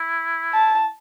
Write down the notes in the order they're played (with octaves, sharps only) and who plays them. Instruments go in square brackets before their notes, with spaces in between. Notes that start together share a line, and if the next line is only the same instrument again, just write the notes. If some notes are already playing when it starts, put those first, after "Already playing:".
Already playing: [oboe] E4
[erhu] A5